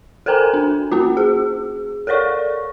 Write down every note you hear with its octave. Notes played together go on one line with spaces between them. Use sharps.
A4 A#4 C5 G5 G#5 A#5
D4
A#3 C#4 F#4
G#4
A4 A#4 C#5 D5 C#6